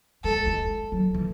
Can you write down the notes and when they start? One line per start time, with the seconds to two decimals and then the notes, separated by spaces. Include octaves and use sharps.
0.24 G#3 A4
0.46 G#3
0.92 F#3
1.14 E3